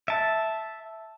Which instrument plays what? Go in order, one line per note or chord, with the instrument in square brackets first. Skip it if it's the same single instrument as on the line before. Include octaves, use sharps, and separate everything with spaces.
[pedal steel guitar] E5 A5